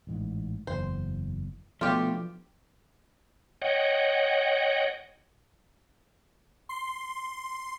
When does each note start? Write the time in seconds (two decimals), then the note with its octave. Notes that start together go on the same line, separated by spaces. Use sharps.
0.07 A1 G#2 E3
0.67 F#1 E2 C5
1.81 B2 F3 A3 C#4 D4 F4 G4
3.62 C#5 D#5 F#5 G5
6.69 C6